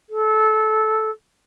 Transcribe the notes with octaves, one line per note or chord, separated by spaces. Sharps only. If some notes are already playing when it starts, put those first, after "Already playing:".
A4